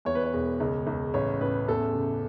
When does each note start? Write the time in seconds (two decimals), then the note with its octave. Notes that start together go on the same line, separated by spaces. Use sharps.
0.05 E2 C#5
0.15 B4
0.24 C#5
0.33 E1
0.60 C#2
0.87 C#2
1.14 A1 C#5
1.41 A1 B4
1.68 E2 A4
1.95 C#3